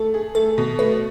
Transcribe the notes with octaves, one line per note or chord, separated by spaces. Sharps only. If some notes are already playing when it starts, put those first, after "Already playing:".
Already playing: A3 A4
G#4
A3 A4
B2
A3 B4